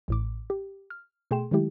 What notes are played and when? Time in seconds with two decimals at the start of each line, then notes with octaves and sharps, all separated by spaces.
0.08 A1 A2 D6
0.50 G4
0.90 F6
1.31 B2 A3 G#4 G5 C6 E7
1.51 D#3 F#3 G#3 A3 E4 G4